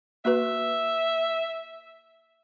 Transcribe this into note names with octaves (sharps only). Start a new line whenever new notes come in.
A#3 F#4 B4 E5